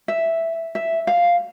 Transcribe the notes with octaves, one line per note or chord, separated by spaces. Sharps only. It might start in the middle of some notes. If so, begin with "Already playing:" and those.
E5
E5
F5